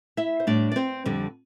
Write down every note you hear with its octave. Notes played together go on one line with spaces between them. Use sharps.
E4 E5
C5
A2 G3 D4 D5
D5
C4 C5
F2 D3 G3